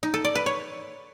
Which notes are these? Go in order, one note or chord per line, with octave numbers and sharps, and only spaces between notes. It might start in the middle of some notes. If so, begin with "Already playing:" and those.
D#4
A4
D5
B4
C#5